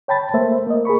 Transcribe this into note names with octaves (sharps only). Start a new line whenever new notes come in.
C#5 G5 A5 B5 A6
A3 A#3 C5 E5
A#3 D#5
G#4 A#4 B5 C#6